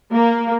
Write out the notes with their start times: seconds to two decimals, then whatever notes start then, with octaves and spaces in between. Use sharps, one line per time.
0.12 A#3